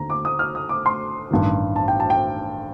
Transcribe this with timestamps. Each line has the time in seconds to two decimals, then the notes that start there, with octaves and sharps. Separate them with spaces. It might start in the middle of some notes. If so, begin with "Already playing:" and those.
Already playing: D#2 D3 A#5
0.10 D6
0.25 D#6
0.39 F6
0.55 D#6
0.69 D6
0.86 C6
1.31 A1 G2 D#3
1.76 A5
1.88 G5
2.00 A5
2.10 G5